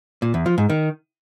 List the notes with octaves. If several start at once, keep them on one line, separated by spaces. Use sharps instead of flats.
A#2
E2
F3
G#2
D#3